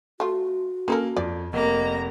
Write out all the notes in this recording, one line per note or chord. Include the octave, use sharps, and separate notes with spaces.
A3 F4 F#4
A#3 C#4 A4 A#4
F2 D5
F1 A#3 D#5 A#5